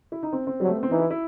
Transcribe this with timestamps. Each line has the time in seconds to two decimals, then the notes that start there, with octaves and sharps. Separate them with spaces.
0.12 E4
0.23 D#4
0.33 C4
0.47 C4
0.60 F#3 G3
0.68 A3
0.75 B3
0.83 C4
0.90 E3 D#4
1.00 E4
1.10 E4